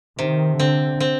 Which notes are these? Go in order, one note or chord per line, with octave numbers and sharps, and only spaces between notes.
C3 D#3
D3 C4
C4